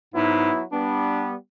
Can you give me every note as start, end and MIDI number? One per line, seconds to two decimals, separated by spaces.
0.14 0.51 44
0.14 0.63 54
0.14 0.63 59
0.14 0.63 64
0.72 1.35 55
0.72 1.35 59
0.72 1.26 62